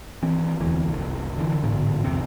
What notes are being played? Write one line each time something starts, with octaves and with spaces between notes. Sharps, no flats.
E3 C4
E1 D2 E3
F#1 C2
D3 E3
A1 G#2 B2 D3
A#1 E2 C3 C4